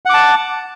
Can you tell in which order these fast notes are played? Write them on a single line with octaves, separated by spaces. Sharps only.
F#5 D6 A5